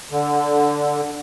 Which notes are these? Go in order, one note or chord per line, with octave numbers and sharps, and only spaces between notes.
D3